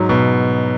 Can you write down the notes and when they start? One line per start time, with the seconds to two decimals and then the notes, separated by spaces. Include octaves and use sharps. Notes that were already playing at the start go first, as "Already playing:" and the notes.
Already playing: G#2 F#3
0.09 B2